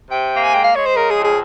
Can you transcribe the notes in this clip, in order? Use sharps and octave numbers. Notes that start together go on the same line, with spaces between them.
C3 G5
A#3
G#5
G#3 G5
F5
G#3 C#5
C5
C#3 A#4
G#4
F2
G#4